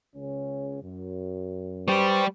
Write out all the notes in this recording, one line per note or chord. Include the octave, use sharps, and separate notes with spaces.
C#2 C#3 C#4
F#2
G3 G4 B4 C5 C#6